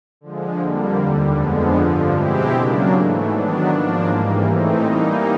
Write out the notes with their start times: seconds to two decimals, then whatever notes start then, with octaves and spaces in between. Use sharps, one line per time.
0.21 D3 F3 G#3
0.59 F2 D3 G3 A#3
0.98 D#2 D3 G3
1.36 F2 D3 F3 G#3 B3
1.75 G2 D3 F3
2.13 B2 G#3 C4 E4 G4
2.52 C#3 F#3 A#3 D4
2.91 G#2 E3 A3
3.30 D#3 F#3 B3 D4
3.68 G#2 F3 A#3 D4
4.06 G#2 E3 G3 A#3
4.45 A2 E3 A3 C4 D#4
4.83 E3 G3 A#3 D#4